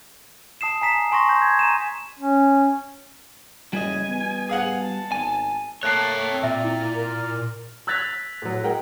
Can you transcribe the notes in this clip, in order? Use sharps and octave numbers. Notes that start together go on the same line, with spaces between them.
A5 D#6 C7 E7
G#5 A#5 B6 E7
G#5 C6 C#6 A#6
G6
G#6
A#5 D#7 E7
C#4
F#1 G3 D#5 G#5
B3
G#4 F5 F#5
A5
G#1 G#5
A3 A#3 A4 C#5 G5 A5 F#6 C7
C4
A#2 D5 E5 A#5 F6
E4
A#4
E6 F#6 G#6 A6 B6 F7
A2 F#3
G#3 A#4 F#5 G5